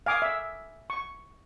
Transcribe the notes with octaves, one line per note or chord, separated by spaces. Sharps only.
F5 G#5 D6 D#6
E5
C#6